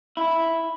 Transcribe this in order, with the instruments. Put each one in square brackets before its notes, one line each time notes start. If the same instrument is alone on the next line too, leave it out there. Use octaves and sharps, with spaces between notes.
[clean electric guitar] E4